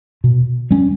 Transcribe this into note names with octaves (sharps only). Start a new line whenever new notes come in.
B2
G3 C#4